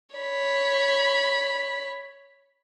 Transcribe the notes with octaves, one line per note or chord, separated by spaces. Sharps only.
C#5 B5